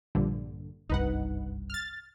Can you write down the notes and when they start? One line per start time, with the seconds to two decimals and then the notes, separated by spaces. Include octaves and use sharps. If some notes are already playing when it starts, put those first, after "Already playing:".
0.15 A#1 G2 D3
0.90 F#1 C2 G2 D#4 B4 F#5
1.70 F6 A6